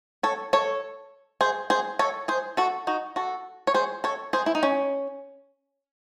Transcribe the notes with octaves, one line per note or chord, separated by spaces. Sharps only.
A4 C#5
A4 C#5
G#4 C5
G#4 C5
A4 C#5
G#4 C5
F#4 A4
D#4 F#4
F#4 A4
C#5
G#4 C5
A4 C#5
G#4 C5
E4
D#4
C#4